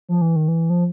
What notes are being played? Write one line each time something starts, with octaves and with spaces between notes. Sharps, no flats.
F3
E3
D#3
E3
F3